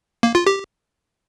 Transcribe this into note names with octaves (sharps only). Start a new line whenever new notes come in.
A#3
F4
G4